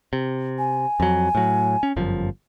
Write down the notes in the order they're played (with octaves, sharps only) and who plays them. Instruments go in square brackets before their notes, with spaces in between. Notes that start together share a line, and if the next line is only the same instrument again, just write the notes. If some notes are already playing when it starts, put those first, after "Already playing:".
[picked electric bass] C3
[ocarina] G#5
[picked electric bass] F2 F#3
A2 F#3
C#4
G1 F#2 F3